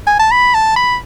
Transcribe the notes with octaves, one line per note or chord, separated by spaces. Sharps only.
G#5
A5
B5
A5
B5